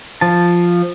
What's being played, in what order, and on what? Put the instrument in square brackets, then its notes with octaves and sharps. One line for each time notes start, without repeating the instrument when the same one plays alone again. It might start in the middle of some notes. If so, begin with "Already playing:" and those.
[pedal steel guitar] F3 A5